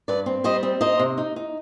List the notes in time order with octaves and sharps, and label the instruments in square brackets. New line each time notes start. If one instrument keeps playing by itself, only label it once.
[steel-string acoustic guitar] G2 B4 D5
C4
G3 C5 D#5
C4
D#4 C5 D#5
C3
D#4
D#4